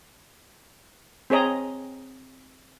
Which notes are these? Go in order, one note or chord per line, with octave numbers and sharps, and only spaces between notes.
C4 G#4 C#5 D#5 A#5